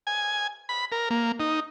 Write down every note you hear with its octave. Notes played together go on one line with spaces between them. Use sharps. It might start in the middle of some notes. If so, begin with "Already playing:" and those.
G#5
B5
A#4
A#3
D#4